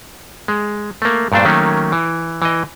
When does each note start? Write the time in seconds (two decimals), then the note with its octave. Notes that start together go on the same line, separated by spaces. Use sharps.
0.48 G#3
1.02 A3 A#3
1.32 G2 A#2 A3 D4 C5
1.45 D#3 F#3 A3 A#3 C#4
1.92 E3
2.42 E3 D#5